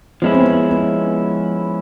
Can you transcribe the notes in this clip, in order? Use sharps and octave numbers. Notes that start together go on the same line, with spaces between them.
F3 G#3 B3 C#4 E4
C4
B3
B3